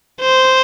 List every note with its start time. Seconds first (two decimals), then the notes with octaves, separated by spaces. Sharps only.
0.21 C5